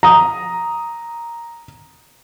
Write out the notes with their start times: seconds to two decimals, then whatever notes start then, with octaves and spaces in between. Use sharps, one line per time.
0.03 A#5 D#6